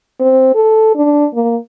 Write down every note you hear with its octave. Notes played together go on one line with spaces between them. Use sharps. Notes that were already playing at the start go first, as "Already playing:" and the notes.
C4
A4
D4
A#3